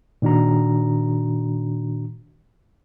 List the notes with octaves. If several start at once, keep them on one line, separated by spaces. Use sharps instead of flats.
A#2 D#3 D4 F#4 A#5